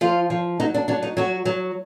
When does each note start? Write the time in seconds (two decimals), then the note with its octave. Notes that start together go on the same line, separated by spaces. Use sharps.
0.01 F3 F4
0.30 F3
0.60 F#3 D#4
0.74 D4
0.88 F#3 D4
1.02 D#4
1.17 F#3 F#4
1.45 F#3